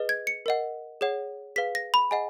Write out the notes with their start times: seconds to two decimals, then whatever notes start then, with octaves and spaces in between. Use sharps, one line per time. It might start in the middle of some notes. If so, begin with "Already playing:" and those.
Already playing: G#4 B4 D#5
0.09 G#6
0.27 C#7
0.46 A#4 D#5 F#5
1.01 G#4 C#5 F#5
1.56 G#4 B4 F5 B6
1.75 A#6
1.94 B5
2.11 G#4 D#5 F#5 G#5